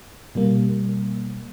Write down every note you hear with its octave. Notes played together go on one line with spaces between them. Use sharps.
B2 G3 A#3